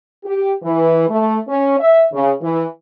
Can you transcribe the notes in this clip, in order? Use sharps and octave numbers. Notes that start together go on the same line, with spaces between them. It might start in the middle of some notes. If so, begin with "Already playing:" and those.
G4
E3
A3
C#4
E5
C#3
E3